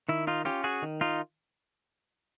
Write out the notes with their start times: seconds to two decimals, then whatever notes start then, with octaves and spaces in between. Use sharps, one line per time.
0.09 D#3 E4
0.27 D#4 F4
0.45 C#4 F4 G4
0.64 F#4 G#4
0.82 D#3
1.01 D#4 F4